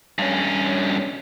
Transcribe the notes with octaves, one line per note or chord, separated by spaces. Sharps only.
G2 C#4